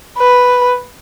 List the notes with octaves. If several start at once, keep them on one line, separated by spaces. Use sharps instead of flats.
B4